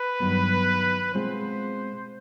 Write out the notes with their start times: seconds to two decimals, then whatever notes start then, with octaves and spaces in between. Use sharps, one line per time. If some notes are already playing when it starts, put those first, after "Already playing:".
Already playing: B4
0.20 G2 D#3 F#3 B3
1.14 B2 G#3 C4 F4 C5